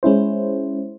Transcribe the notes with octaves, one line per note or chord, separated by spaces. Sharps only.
G#3 C#4 E4 C5